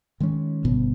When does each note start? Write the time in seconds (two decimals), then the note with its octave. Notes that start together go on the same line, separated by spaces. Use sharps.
0.20 D#3 G#3 C#4
0.64 G1 B2